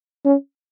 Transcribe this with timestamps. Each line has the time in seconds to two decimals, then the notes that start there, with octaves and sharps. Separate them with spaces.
0.25 C#4